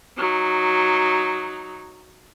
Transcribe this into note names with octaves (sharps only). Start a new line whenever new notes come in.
F#3 D#4